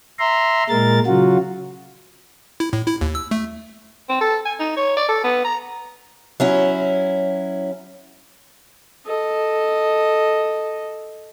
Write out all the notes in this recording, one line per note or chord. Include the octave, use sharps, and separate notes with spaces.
E5 A#5 C6
A#2 G#3 A#4 A6
C#3 F#3 F4 F#4
E4
A2
E4
D#2
E6
A3
C4
A4
G#5
D#4
C#5
D5
A4
B3
A#5
F#3 C#4 E4
A4 D#5